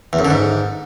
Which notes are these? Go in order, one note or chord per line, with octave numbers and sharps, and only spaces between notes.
E2
F#2
D3
G#2